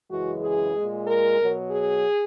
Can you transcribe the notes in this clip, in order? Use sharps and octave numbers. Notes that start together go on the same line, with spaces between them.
F#2 C#3 E3 G#3 F#4
G#4
A#2 G#3
A#4
B2 F#3
G#4